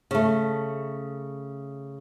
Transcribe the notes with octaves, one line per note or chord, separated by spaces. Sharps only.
C#3 A3